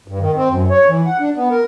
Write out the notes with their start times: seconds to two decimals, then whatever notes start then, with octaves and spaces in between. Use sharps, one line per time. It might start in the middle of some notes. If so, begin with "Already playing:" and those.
0.08 G2
0.20 D#3
0.36 C4
0.49 F#2
0.70 C#5
0.89 E3
1.06 F#5
1.19 D4
1.36 B3
1.51 A#4